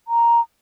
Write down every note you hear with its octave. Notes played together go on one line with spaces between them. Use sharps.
A#5